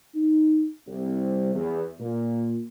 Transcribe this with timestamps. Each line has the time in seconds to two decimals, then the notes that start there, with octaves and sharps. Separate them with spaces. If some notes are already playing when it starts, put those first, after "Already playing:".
0.15 D#4
0.87 C2
1.55 E2
1.99 A#2